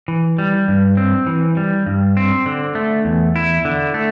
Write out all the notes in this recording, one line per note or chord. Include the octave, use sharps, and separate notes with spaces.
E3
G3
G2
C4
E3
G3
G2
C4
D3
A3
E2
E4
D3
A3